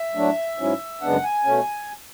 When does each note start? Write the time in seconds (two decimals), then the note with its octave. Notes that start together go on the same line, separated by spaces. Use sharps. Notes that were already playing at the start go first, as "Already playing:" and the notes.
Already playing: E5
0.15 A2 F#3 A3 D4
0.57 G#2 F#3 C#4 E4
1.01 F#2 C#3 G#3 B3 D4 F#5
1.24 G#5
1.45 B2 A3 C#4